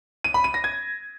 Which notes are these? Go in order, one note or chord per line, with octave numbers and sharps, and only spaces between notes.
D#7
B5
D#7
A#6
G#6